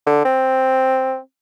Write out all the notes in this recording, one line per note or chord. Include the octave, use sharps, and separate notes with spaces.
D3
C4